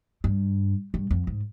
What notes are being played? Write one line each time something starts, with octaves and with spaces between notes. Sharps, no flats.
G2
G2
F2
G#2